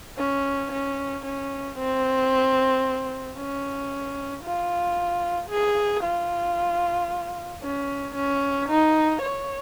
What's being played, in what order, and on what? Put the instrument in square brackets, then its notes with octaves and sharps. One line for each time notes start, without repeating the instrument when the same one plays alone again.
[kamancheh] C#4
C#4
C#4
C4
C#4
F4
G#4
F4
C#4
C#4
D#4
C#5